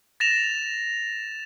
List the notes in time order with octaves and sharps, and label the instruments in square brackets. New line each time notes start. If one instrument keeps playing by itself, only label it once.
[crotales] A6 A#6 E7 F7